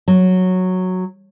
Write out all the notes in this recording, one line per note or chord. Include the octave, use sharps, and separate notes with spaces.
F#3